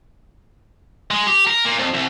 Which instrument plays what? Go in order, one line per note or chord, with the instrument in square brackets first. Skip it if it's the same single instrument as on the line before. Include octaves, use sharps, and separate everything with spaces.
[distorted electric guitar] G#3
G4
A#4
A#2
F2
C2